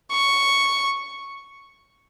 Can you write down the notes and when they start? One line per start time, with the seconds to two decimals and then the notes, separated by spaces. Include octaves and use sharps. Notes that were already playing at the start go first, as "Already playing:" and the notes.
0.11 C#6